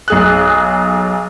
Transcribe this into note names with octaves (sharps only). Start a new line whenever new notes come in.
B1 G#4 F#6